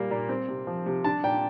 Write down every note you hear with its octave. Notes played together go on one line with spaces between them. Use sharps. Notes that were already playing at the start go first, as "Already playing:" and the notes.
Already playing: A#2 G3 A#3
A#2
C4
C3
F3
C3
D4 A5
A#2 G5